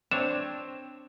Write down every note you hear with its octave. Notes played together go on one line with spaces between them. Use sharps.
C4 D4 C#5 E7